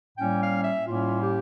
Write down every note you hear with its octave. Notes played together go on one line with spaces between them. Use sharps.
A2 G3 A#3 C#4 G5
F5
E5
A2 G3 A#3 C#4 F4
G4